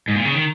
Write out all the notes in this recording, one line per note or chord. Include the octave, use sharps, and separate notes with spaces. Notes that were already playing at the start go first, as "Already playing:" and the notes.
G#2
A#2
C#3
D#3